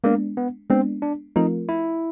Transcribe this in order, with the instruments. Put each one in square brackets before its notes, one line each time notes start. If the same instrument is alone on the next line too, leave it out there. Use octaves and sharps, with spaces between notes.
[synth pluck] G#3 B3 D4 [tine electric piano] A#3
[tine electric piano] B3
[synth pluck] G#3 B3 D4 [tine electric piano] C4
[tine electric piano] D4
[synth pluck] F3 A3 C4 F4 A#4 [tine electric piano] D#4
[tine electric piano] E4